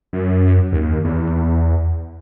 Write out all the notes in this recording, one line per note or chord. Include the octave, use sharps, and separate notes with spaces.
F#2
D#2
E2